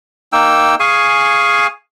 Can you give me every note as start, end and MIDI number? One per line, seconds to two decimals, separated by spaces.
0.33 0.75 58
0.33 0.75 63
0.33 0.75 79
0.33 0.75 88
0.80 1.67 68
0.80 1.67 77
0.80 1.67 80
0.80 1.67 85